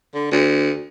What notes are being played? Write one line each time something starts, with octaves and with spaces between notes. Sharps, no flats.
D3
D2